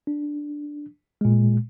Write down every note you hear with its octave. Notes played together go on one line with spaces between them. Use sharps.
D4
A#2 G#3